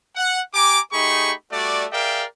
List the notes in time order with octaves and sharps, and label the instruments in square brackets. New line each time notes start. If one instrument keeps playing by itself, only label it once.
[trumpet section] F#5
G4 G#5 A#5 D6
A3 D#4 G4 G#4 B5 C#6
G3 A3 F#4 D5
G#4 A#4 D5 E5 F5 G5